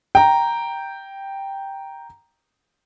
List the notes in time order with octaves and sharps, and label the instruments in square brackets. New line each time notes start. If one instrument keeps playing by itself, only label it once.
[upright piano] G5 A#5